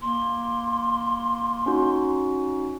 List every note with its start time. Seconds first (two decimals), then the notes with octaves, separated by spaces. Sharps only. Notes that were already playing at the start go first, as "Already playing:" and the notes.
0.01 A#3 C6
1.66 C#4 D#4 F#4